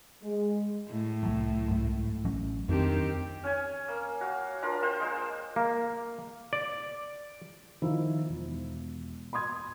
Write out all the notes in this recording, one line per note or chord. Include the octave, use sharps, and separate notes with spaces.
G#3
A2
C2 F#3 A3
C2 G#2
A1 F#3 C#4
F2 D#3 B3 C4 D4 G4
C#4 G#5
A#3
F#4 F5
D4 F4 A#4
A#3 F4 C5 G5
G#3 C5
A#3
D5
D#3 F3 E4
E1
B5 C6 D#6 G#6